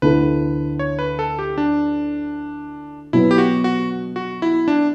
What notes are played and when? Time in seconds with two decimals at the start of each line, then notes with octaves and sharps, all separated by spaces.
0.02 D2 D3 A3 E4 B4
0.79 C#5
0.99 B4
1.19 A4
1.39 G4
1.58 D4
3.13 B2 F#3 B3 E4
3.31 G4
3.38 F#4
3.64 F#4
4.16 F#4
4.42 E4
4.68 D4